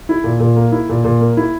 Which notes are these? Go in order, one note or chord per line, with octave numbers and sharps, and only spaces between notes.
E4
A#2
A#2
A#3
E4
A#2
A#2
A#3
E4